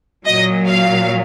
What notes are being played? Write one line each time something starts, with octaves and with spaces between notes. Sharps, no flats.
A#2 F#3 D#5
F5